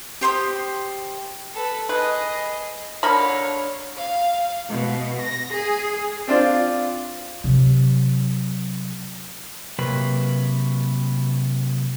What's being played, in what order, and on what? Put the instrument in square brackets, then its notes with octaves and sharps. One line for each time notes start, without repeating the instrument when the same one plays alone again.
[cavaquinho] G4 C5 C6 D#6
[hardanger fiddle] A4 B4
[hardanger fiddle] G#4 D#5 [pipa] B4
[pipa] D3 A#4 B5 [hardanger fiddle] C#5 F5
[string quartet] F5
B2
A#6
G#4
[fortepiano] C4 D4 F4 D5
[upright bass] C3 F#3
[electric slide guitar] C3 F#3 A#3 B4